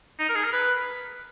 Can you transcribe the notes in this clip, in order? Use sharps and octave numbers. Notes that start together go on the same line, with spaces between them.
D#4
A#4
G#4
A#4
B4